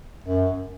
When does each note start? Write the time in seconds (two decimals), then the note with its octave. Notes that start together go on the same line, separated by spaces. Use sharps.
0.24 F#2